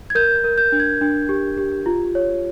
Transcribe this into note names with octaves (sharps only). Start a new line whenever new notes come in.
G#6
A#4 G6
A#4
G6
D4
G#6
D4
G4
G4
F4
C#5